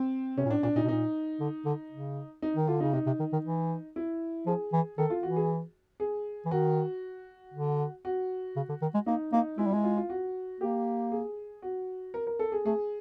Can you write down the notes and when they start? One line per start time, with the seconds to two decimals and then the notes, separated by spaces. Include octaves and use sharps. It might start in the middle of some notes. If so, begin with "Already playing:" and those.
Already playing: C4
0.37 C3 C#4
0.45 A#2
0.50 A2 D4
0.63 A#2 D4
0.75 A#2 D#4
0.83 B2
0.88 A#2 D#4
1.40 D3
1.65 D3
1.91 C#3
2.42 D#4
2.55 D#3
2.67 D3 F4
2.80 C#3 D#4
2.93 C3 D#4
3.06 C3
3.19 D#3
3.32 D#3
3.45 E3
3.96 E4
4.46 F3 G#4
4.72 E3
4.98 D#3 A4
5.10 F4
5.23 E3 F#4
5.36 G#4
6.00 G#4
6.45 E3
6.51 D#3 F#4
7.54 D3
8.05 F#4
8.56 C#3
8.69 D3
8.82 D#3
8.94 G#3
9.06 A#3 D#4
9.33 A#3 D#4
9.58 G#3 E4
9.66 G3
9.71 G#3 E4
9.84 F4
9.97 F4
10.10 F#4
10.60 A#3 G4
11.12 G#4
11.62 F#4
12.14 A#4
12.27 A#4
12.39 A4
12.52 G#4
12.65 A3 G#4